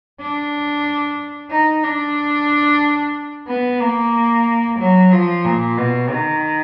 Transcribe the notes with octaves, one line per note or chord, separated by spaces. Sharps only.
D4
D#4
D4
B3
A#3
F#3
F3
A#2
B2
D#3